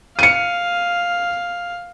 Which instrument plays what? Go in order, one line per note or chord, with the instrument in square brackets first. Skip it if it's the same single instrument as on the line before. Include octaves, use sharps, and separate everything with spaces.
[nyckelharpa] F5 [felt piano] C#7 D#7